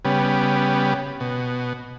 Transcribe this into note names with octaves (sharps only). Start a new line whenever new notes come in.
C#3 G3 B3
B2